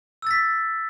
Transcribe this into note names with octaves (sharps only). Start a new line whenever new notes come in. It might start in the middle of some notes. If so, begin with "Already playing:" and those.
E6 A6 B6